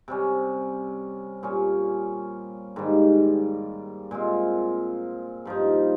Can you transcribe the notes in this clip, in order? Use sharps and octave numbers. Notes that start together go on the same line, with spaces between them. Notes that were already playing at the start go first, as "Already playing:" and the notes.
C3 G3 C#4
A#2 G3 C#4
G#2 D#3 G3 A#3
A#2 G#3 C4 F4
G2 F3 A#3 D#4